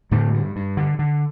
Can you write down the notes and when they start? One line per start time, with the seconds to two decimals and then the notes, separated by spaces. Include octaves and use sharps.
0.11 A2 D3 A3
0.34 G2
0.56 G2
0.77 D3
0.99 D3